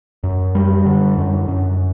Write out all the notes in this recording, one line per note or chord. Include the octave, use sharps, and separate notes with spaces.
F#2
G3
D3
F#2
F#2